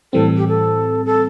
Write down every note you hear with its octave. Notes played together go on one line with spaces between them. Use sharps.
A2 E3 G3 C4 A4
G4
A4
A4